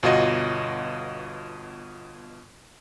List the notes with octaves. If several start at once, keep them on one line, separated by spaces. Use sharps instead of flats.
G1 B2 F4 F#4 D#5